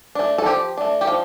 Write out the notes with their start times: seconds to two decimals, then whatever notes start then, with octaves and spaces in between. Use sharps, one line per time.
0.15 A3 D4
0.38 A4
0.46 F3 G4
0.78 A3 D4
1.01 G4
1.07 F3 F4